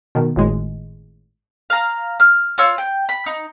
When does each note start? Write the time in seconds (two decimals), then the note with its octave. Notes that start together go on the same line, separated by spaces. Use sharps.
0.15 B2 D#3
0.36 G#1 A2 G#3
1.70 F5 A#5
2.20 F6
2.58 F4 C#5 E6
2.78 G5
3.09 B5
3.26 D#4